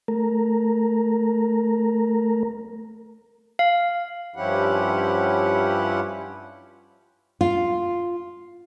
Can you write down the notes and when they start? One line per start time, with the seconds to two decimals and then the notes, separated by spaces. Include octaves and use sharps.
0.08 A3 A#4
3.59 F5
4.36 G2 F3 C#4 E4 G4 F#5
7.41 F4